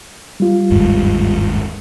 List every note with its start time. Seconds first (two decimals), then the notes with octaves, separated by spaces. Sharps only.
0.40 G3 F4
0.70 G1 D#2 G#2